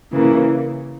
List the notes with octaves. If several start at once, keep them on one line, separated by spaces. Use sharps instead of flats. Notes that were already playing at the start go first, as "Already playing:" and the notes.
C#3 E3 A#3